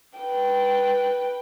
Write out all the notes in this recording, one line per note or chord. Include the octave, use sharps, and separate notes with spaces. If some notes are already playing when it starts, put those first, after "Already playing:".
B4 G5